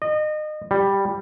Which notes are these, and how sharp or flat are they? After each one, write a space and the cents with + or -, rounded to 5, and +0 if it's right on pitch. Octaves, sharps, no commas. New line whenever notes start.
D#5 -30
G3 +5